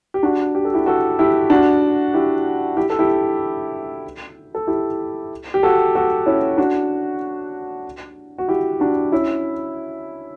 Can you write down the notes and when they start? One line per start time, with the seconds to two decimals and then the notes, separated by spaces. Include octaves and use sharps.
0.14 G4
0.23 D4 F#4
0.55 G4
0.65 A4
0.74 E4 G4
0.86 F#4 A4
1.19 E4 G4
1.50 D4 F#4
2.14 E4 G4
2.77 E4 G4
2.90 A4
2.99 E4 G4
4.55 A4
4.67 E4 G4
5.54 G4
5.63 F#4 A4
5.95 F#4 A4
6.26 C#4 E4
6.58 D4 F#4
8.38 F#4
8.48 E4 G4
8.80 D4 F#4
9.12 C#4 E4